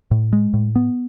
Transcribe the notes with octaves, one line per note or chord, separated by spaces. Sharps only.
A2
G#3
A2
B3